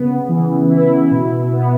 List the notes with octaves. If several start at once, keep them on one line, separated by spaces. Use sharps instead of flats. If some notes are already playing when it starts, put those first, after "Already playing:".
Already playing: C#3 B3
E3
E4
B2
B3